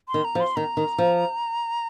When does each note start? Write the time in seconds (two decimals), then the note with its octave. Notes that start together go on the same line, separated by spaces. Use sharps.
0.08 C6
0.14 D#3
0.24 A#5
0.35 F3
0.40 C6
0.56 D#3 A#5
0.77 D#3
0.98 F3